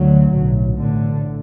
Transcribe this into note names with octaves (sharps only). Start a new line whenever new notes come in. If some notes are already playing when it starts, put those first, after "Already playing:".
Already playing: D2 D3 F#3
B1 A2
A1 A2 D3